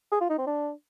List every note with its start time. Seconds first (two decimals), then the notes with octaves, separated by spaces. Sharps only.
0.12 G#4
0.21 F4
0.30 D#4
0.38 C4
0.47 D4